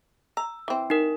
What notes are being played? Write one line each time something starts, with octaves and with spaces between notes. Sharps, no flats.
A#5 E6
E3 C4
D#4 A#4